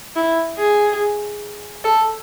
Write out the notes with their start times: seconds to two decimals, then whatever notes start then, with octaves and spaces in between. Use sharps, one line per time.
0.16 E4
0.58 G#4
1.84 A4